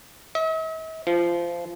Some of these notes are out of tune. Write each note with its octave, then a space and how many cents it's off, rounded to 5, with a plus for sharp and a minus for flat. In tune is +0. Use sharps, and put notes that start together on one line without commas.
E5 -45
F3 -20